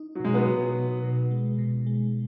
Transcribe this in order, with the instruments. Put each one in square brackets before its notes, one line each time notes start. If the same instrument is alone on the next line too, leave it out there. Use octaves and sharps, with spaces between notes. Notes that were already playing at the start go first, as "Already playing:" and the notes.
Already playing: [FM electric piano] D#4
[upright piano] F#3
[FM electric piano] B2 [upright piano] G#3
[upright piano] F#3 B3
[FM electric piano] B2
B2
B2
G#3
B2
G#3